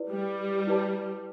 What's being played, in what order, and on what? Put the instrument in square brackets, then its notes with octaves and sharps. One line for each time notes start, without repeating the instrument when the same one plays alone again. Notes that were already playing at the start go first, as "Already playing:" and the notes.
Already playing: [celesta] E4 B4 D5
[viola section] G3
[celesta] E4 B4 D5 A5